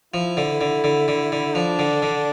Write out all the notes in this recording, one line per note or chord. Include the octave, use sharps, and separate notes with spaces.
F3 E4
D3
D3
D3
D3
D3
F3 D4
D3
D3